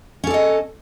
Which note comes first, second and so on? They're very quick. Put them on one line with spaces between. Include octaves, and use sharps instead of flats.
C#4 A4 D5 D#5